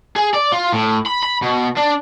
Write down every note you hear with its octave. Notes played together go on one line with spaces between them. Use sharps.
G#4
D5
F4
A2
B5
B5
B2
D4